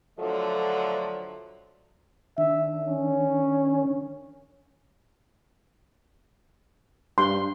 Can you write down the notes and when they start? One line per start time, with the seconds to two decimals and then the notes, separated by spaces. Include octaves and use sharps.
0.18 D3 F3 F#3 A3 F#4 A4
2.38 D#3 D4 E5
2.85 C#4
7.18 G2 C6